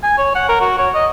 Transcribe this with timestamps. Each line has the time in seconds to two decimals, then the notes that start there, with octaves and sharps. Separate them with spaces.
0.03 G#5
0.18 C#5
0.35 F#5
0.49 A#4
0.61 F#4
0.79 C#5
0.95 D#5